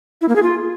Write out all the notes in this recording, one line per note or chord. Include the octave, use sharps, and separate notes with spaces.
E4
A#3
G#4
F4